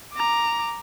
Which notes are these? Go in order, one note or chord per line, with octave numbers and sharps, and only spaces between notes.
A#5 D6